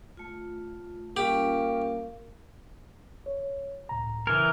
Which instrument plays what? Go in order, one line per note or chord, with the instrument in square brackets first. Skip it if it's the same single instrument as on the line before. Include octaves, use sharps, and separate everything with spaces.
[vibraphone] A3 F4
[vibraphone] G3 C#4 F4 [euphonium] A#3 [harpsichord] G4
[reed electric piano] C#5
C#2 A2 A#5
[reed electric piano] C#3 G#6 [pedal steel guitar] E3 A#4